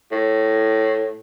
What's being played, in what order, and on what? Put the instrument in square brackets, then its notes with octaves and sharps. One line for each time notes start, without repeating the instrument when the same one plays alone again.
[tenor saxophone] A2